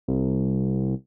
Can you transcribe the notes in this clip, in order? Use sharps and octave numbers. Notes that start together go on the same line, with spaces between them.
C2